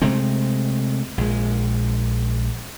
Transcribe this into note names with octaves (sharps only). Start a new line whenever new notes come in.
C3 G#3 A3 C4
A#1 G#3